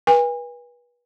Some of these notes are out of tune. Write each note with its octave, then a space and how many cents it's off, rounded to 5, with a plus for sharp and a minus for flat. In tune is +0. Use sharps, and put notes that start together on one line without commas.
B4 -30 G#5 -35